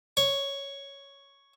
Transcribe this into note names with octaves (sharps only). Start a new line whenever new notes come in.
C#5